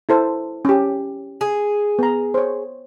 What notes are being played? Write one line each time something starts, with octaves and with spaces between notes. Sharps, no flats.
E4 A4 C5
C#4 G4
G#4
B3 A#5
C5 C#5